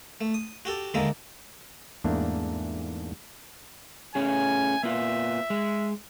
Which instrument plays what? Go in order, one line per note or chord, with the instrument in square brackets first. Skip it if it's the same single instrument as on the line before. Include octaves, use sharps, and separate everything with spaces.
[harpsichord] A3
D#6
F#4 G4 A4
D#2 D3 G#3 A#3 E5 A#5
[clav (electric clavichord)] E2 G#2 A3 A#3 D4
[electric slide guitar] A3 C#4 G#4 [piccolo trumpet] G#5
[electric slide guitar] A#3 B3 F4 [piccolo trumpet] E5
[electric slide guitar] G#3